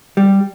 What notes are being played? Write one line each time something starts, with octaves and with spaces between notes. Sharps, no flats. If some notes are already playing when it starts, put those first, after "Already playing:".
G3